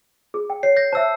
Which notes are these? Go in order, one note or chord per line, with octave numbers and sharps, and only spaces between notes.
G#4
G5
C#5 C7
G6 A#6
C5 E5 A5 E6